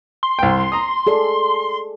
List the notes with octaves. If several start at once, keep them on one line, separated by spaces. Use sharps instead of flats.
C6
C2 G5
A#5 D#6
G#4 A4 D5